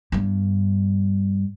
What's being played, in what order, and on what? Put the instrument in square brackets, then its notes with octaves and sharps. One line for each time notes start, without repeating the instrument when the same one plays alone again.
[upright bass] G2 B3